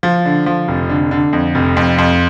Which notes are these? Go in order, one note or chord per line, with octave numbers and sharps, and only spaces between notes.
F3
D3
F3
F1
D3
D3
F2
F1
F2
F2